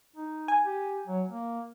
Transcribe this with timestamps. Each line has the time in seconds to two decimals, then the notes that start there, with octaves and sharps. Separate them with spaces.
0.16 D#4
0.48 G#5
0.64 G4
1.07 F#3
1.29 A#3